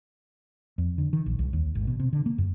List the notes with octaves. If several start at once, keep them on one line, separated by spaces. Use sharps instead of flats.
F2
D3
D#3
A#1
C2
D#2
G#1
B2
C3
D3
A#3
F#2